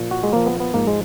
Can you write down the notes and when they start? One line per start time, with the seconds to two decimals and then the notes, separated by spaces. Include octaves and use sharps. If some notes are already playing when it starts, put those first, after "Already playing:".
Already playing: A#2 F3
0.11 F#4
0.23 G#3
0.33 A#2 F3 A#3
0.46 B3
0.60 B3
0.74 G#2 F3 A#3
0.87 G#3